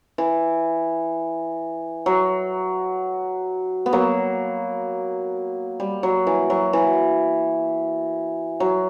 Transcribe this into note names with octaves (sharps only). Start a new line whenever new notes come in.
E3
F#3
B3
F#3 A#3
G3
F#3
E3
F#3
E3
F#3